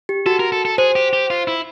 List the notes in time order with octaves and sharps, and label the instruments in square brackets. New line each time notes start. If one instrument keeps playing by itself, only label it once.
[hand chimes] G4
[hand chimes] F#4 [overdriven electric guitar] A4
[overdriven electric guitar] A#4
A4
A4
[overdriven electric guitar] G#4 [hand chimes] C5
[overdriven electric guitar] G4
G4
F4
E4